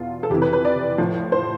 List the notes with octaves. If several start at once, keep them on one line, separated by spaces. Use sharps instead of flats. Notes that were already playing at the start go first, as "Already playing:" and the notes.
Already playing: E2 B2 F4
A4
F2 C3 E3 G4
B4
B4
D5
A2 F3
C5